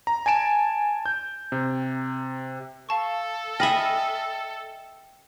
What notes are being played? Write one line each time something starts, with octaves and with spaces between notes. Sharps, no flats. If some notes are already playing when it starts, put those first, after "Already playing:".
A#5
G#5 A5 D7 E7
G6
C3
A4 F5 A5 C#6
D#5 E5 G5 G#5 B5 D#6 F6